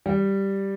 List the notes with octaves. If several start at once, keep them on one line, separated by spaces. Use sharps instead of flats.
G3